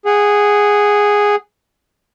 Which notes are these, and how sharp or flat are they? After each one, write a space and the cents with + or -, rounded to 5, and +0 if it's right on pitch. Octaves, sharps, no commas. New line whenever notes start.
G#4 -5 F#5 +15